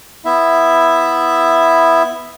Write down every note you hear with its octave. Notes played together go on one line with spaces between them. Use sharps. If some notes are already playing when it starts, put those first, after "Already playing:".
B3 E4 E5